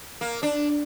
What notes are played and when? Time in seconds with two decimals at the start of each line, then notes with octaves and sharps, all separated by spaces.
0.21 A#3
0.43 D4